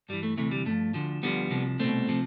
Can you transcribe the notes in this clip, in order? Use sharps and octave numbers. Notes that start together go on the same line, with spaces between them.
G2 E3 G3
A3
D2 C3 E3 A3
G3
G2 F3 A3
D2 D3 F3
D2 D3 F3 G3 B3
C2 C3 F3
C2 B2 A3 C4
C3 F3